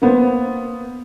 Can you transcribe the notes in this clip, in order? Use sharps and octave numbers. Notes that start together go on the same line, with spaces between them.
A#3 B3 C5